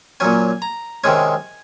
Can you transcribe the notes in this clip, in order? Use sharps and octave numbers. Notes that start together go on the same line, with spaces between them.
A#2 F#3 C#4 G#5
A#5
C3 D#3 G#3 C#4 G#5